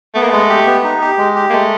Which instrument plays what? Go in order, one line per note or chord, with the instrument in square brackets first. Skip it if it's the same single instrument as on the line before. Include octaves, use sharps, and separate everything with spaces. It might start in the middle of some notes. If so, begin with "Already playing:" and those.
[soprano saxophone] A3 [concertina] B3
[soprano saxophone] A#3
[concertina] G#3 [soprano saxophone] A3
[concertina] G4
B3
D#4
G4
G#3
G4
[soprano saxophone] A#3
[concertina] G#3 [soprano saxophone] A3